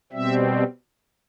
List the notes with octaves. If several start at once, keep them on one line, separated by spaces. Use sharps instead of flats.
B2 G3 C4 E5